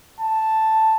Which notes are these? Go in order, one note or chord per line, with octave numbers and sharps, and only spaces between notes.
A5